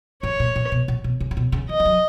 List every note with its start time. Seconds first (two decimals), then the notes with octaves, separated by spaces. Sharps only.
0.23 G#2 C#5
0.40 A#2
0.56 A#2
0.72 B2
0.88 A#2
1.04 B2
1.20 C#3
1.31 C#3
1.37 B2
1.52 C#3
1.69 E3 D#5
1.80 E3
1.85 F#3